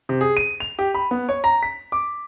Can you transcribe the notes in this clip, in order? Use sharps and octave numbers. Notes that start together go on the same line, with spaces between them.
C3
G#4
D#7
F7
G4
B5
B3
C#5
A#5
B6
D6